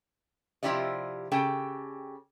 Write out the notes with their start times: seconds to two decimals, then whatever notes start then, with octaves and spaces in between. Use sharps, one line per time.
0.63 C3 F3 E4 G4 D5 D#5
1.32 C#3 G4 A4 G5